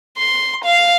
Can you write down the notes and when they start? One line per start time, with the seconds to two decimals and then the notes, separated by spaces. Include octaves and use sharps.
0.18 C6
0.65 F5